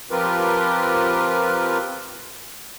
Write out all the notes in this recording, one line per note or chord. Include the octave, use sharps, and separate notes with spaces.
F3 C4 F4 G4 A#4 B4